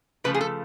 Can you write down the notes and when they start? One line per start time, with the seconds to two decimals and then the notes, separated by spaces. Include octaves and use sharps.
0.24 C#3 F3 A3 B4
0.34 G#4
0.41 A4